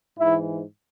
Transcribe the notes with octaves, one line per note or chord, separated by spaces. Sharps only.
G#2 E3 E4